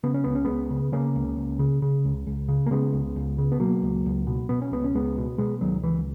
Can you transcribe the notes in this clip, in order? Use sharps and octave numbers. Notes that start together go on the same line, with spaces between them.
C#3 B3
C#4
C#2 B3
C#4
C#2 G#3 B3
C#3
C#3 A#3 C#4
C#2
C#2
C#3
C#3
C#2
C#2
C#3
A#3
C#3 G#3 B3
C#2
C#2
C#3
B3
B2 F#3 A#3
C#2
C#2
B2
B2 B3
C#4
C#2 B3
C#4
C#2 G#3 B3
B2
B2 G#3 B3
C#2 D#3 F#3
C#2 E3